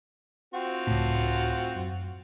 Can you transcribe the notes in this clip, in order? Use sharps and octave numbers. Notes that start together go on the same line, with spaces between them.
C4 F4 F#4
C#2 A2
F#2